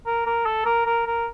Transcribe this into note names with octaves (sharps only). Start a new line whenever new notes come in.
A#4
A#4
A4
A#4
A#4
A#4